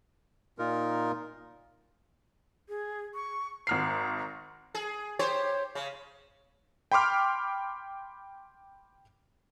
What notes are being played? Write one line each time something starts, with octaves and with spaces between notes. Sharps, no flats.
A#2 D#4 F4 A#4
G#4
C#6
G#1 A#5 F6 C7
G#4
G4 C5 C#5
C#3
G5 B5 C6 D6 F6